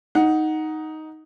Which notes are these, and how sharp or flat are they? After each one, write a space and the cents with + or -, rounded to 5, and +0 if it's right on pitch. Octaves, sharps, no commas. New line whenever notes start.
D#4 +5 F#5 +0